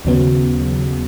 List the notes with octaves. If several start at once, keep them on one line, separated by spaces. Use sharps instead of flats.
D#2 C#3 F#3 B3